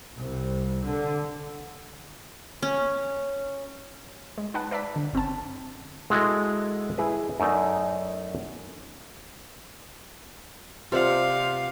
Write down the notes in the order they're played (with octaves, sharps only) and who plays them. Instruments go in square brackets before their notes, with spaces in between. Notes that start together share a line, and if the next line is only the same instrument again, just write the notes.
[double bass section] C2
D3
[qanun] C#4
[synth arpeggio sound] G#3
D#4 B4 F#5 A5
B4 D5 E5 A5 B6
D3
G1 C4 C#4 A5
[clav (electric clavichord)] G#3 E4 F#4 A4 D#5 F#5
E4 G#4 B4
F#2 A3 D#4 D5 A5
[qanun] C3 F#5 [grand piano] F4 C5 D5 [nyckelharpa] F5